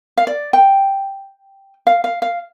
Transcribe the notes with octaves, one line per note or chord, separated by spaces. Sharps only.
F5
D5
G5
F5
F5
F5